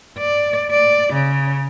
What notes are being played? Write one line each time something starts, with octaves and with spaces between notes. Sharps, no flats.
D5
D5
C#3